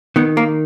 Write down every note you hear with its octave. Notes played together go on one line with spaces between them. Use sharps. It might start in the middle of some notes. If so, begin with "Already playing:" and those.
D#3 B3
A#3